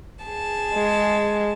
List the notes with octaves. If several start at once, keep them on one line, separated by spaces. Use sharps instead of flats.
G#4 A5
G#3